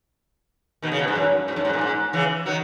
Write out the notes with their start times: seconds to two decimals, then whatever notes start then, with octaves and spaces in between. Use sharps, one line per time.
0.82 B2 D#3
0.92 C#3
0.99 B2
1.08 G#2
1.15 F#2
1.48 G#2
1.56 F#2
1.65 G#2
1.73 A#2
1.81 G#2
2.13 C#3 E3
2.46 D#3 F#3